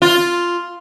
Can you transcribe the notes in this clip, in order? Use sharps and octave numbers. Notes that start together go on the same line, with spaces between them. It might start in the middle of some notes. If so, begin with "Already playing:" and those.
F4